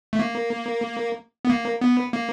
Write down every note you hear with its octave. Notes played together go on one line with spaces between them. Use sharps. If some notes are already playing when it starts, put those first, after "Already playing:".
A3
A#3
B3
A#3
B3
A#3